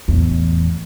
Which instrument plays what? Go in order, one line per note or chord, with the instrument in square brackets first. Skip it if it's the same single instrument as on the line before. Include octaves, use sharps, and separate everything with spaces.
[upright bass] E2 A2